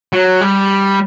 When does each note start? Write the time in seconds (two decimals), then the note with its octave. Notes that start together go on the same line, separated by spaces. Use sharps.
0.13 F#3
0.41 G3